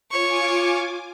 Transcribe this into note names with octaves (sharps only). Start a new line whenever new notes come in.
F4 C#5 G#5 C#6 D6